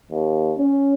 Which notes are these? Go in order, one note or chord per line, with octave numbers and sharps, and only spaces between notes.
D#2
C#4